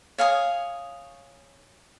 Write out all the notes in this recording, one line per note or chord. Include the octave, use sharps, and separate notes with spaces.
C#5 F5 G#5 D#6